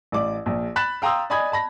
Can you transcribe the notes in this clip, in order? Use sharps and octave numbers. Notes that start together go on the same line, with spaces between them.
A1 D5 D6
A#1
B5 F#6 A6 B6 E7 F#7
F5 G5 A#5 C6 D#6 E6
D5 D#5 G#5 B5 D#6 G#6
A5 B5 A#6